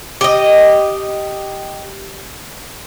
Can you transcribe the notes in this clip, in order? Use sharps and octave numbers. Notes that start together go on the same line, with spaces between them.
G4 D#5